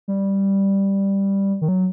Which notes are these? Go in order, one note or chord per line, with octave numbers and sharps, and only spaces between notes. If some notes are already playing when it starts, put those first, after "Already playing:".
G3
D#3
F#3